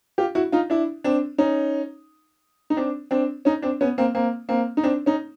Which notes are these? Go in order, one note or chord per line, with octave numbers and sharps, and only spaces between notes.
F4 G4
E4 F#4
D#4 F4
D4 E4
C4 D4
C#4 D#4
D#4
C4 D4
C4 D4
C#4 D#4
C4 D4
B3 C#4
A#3 C4
A#3 C4
A#3 C4
D#4
C4 D4
C#4 D#4